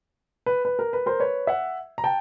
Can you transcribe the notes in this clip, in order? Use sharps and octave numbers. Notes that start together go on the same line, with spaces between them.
B4
B4
A#4
B4
A#4 C5
B4 C#5
E5 F#5
A#5
G5 A5